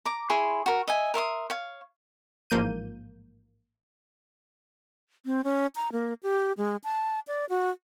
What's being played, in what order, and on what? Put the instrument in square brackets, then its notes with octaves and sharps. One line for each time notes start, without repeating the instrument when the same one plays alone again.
[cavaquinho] A#5 D6
E4 G#4 C#5 C6
F#4 A#4
D#5 E5 G#5
A#4 E5 C6 D#6
C#5 F5
[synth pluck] A1 G#2 F3 A#3 G6 D#7
[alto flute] C4
C#4
A#5
A#3
G4
G#3
A5
D5
F#4